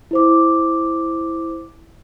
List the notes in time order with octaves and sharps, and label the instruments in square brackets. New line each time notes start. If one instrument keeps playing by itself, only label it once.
[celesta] E4 C5 D6